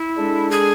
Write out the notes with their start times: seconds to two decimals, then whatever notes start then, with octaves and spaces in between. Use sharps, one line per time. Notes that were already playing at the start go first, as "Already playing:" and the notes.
Already playing: E4
0.17 G#3 D4 A4
0.51 G#4